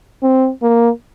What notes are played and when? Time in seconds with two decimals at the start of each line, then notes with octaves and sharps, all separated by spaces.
0.23 C4
0.62 A#3